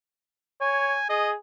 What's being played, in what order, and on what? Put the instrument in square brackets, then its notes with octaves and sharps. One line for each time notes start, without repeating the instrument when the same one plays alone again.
[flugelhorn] C#5 [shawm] G#5
[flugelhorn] G#4 [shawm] D#5